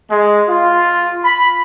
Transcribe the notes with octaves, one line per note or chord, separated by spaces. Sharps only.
G#3
F4
B5